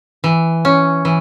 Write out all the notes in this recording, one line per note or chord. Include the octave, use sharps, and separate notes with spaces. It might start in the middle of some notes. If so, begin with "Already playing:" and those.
E3
C#4
E3